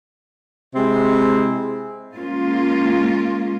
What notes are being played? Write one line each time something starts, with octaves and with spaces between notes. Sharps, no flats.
C3 G#3 C4 E4
G#3 A#3 C#4 F4